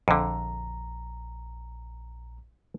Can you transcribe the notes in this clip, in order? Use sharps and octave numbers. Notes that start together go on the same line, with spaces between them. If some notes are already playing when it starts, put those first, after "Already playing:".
A#1 F2 D3 A#5